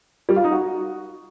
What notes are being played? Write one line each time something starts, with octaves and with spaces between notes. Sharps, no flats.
G3
F4
D#4
F#4